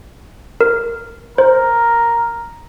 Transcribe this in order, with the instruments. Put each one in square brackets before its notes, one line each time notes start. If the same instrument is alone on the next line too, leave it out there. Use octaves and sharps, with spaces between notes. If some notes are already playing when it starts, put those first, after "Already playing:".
[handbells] A#4
[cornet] A#4 [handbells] C5